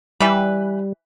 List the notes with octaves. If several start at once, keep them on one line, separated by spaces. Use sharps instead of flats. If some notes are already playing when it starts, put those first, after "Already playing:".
E3 G3 B4